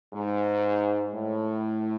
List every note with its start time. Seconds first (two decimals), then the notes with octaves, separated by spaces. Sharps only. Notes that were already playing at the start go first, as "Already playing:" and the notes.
0.13 G#2
1.13 A2